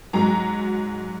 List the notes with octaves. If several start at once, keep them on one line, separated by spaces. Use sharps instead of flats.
G#2 F#3 A#5